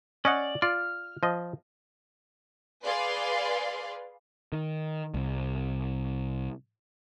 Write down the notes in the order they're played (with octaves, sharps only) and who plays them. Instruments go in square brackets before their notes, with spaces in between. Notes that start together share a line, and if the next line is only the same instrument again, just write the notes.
[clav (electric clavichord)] C#4 D#5 F#5 [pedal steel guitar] D5
[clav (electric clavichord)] F4 D5 [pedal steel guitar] F6
[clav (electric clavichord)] F3 D#5
[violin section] G#4 B4 D5 F5 C6
[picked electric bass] D#3
C2